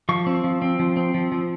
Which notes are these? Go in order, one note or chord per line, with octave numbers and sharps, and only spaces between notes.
F3 C#6
C4
F3
C4
F3
C4
F3
F3